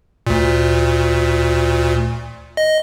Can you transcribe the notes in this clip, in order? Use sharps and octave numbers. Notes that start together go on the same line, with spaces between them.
D2 A#2
D#5